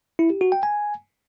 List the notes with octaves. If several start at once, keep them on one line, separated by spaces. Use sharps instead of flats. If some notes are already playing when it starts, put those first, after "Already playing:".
E4
G4
F#4
G5
G#5